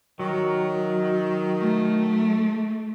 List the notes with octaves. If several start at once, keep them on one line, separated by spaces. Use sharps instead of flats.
D#3 F#3
A3